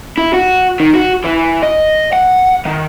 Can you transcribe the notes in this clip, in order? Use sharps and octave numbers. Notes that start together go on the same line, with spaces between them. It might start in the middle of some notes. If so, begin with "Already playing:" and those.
E4
F#4
D#3
F#4
E3
D#5
F#5
D#3